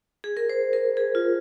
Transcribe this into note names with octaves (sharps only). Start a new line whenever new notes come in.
G#4
A#4
C5
A#4
G#4
F4